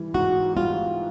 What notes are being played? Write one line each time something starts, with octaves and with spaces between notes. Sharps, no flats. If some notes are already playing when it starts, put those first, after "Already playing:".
Already playing: E3 G3
G#2 F#4
G3 F4